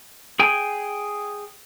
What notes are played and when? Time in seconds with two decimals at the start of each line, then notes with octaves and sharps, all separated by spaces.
0.39 G#4 G5 G#5